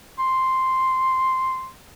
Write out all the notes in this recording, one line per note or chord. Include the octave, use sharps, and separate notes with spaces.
C6